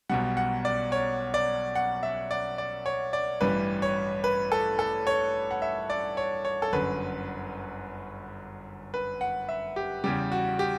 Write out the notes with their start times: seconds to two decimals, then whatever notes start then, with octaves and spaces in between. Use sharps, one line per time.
0.09 B1 B2 G3 F#5
0.37 F#5
0.65 D5
0.92 C#5
1.34 D5
1.75 F#5
2.03 E5
2.31 D5
2.58 D5
2.86 C#5
3.13 D5
3.41 A1 G2 E3 G3 B4
3.82 C#5
4.24 B4
4.52 A4
4.79 A4
5.07 C#5
5.51 F#5
5.62 E5
5.90 D5
6.17 C#5
6.45 C#5
6.62 A4
6.72 G1 F#2 D3 B4
8.94 B4
9.21 F#5
9.49 E5
9.76 G4
10.04 E2 C#3 G3 G4
10.32 F#4
10.59 G4